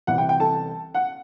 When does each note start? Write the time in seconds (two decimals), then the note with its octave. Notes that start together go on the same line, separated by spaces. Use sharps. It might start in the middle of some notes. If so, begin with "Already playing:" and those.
0.07 C2 C3 E3 F#5
0.18 G5
0.29 G5
0.40 A4 A5
0.95 F#5